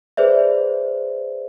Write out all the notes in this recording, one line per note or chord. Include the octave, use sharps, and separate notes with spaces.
G#4 B4 C5 D5 E5